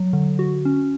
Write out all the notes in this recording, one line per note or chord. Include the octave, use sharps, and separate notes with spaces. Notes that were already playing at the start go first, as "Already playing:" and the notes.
Already playing: F#3
D3
F#4
C#4